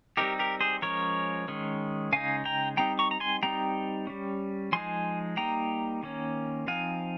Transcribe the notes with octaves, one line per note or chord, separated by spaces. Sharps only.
G3 C4 D#4 G4 A#4
G4 A#4
G#4 C5
F3 G#3 C#4 A#4 C#5
D#3 G#3 C#4
C#3 G#3 D#4 F5 G#5
G5 A#5
G3 C4 D#4 G5 A#5
A#5 C#6
A#5
G#5 C6
G3 C4 D#4 G5 A#5
G3 C#4
F3 G#3 D#4 G#5 C6
G3 A#3 D#4 G5 A#5
D#3 A#3 C#4
F3 C4 D#4 F5 G#5